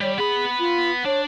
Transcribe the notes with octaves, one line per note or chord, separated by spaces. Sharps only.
G3 C#5
B3 G#4 B5
F4
D4 C#5